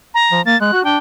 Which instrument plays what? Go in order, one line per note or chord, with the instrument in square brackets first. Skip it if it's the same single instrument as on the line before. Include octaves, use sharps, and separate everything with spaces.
[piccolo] A#5
[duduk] F3
[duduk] A#3 [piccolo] A6
[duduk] G#3 [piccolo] F#6
[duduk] F#4
[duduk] D4 [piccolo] G5